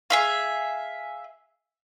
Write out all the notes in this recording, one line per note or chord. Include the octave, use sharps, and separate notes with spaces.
G#4 E5 F5